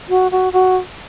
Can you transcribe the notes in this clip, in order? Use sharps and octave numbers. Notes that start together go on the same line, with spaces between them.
F#4
F#4
F#4